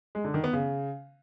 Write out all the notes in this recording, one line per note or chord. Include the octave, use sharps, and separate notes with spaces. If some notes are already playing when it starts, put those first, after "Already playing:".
G#3
D3
D#3
B3
C#3